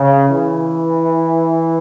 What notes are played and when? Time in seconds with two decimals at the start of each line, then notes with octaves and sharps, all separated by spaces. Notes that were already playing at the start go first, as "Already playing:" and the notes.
Already playing: C#3
0.28 E3